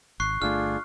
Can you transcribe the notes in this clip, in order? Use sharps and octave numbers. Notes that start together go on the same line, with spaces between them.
G#1 C#6 F#6 C7
G1 A3 D4 F4 G#4 F6